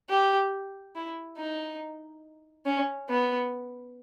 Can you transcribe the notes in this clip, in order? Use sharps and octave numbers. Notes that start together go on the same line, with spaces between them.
G4
E4
D#4
C#4
B3